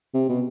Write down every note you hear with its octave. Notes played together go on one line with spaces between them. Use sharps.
C3
B2